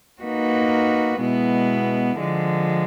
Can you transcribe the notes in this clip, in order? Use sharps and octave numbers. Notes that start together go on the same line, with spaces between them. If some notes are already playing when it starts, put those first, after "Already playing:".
A#3 D#4 F#4 B4
B2 G#3 B3 E4
D3 F3 G#3